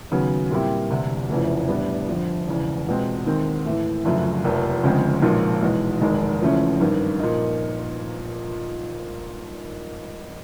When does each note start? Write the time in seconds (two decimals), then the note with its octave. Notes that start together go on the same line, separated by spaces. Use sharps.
0.11 D#2 C#3 F#3 B3
0.51 A#2 G3 C4 E4 G4
0.90 E1 D2 C3
1.29 F1 F2 C#3 E3 A3
1.68 A2 E3 G3 B3 D4
2.07 F2 D3 F3
2.47 E1 E2 C#3
2.86 C#2 B2 G#3 C4
3.26 D#2 D#3 G#3 C4
3.65 A2 E3 A3
4.05 G1 F#2 C#3 F3 A3
4.44 F1 F2 C3 F3 A#3
4.84 D2 C#3 F3 G#3 C4
5.22 B1 A#2 F3 G#3
5.62 E2 B2 G#3
6.01 F1 D#2 D#3 G#3
6.41 E2 C#3 F3 A3 C#4
6.80 G#1 G2 D#3
7.19 A#2 F3 A#3 D#4